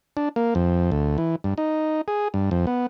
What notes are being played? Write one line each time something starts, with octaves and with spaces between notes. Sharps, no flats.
D4
A#3
F2
D2
E3
G2
D#4
G#4
G2
F2
B3